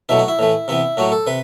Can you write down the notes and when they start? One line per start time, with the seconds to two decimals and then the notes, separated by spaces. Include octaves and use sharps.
0.09 B2 F#3 A3 E4
0.19 F#4
0.28 E4
0.39 A2 E3 A3
0.68 C3 E3 B3 E4
0.97 A2 F#3 A3 F#4
1.12 A4
1.27 C3 B4